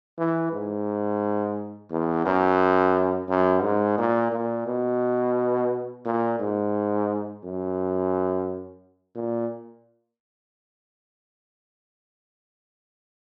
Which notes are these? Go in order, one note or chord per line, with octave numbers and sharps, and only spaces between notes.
E3
G#2
E2
F#2
F#2
G#2
A#2
A#2
B2
A#2
G#2
F#2
A#2